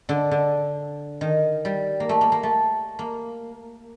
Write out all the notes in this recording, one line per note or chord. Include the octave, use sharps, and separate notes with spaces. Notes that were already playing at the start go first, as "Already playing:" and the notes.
D3
D3
D#3
G3
A#3
A3
A#3
A#3
A3
A#3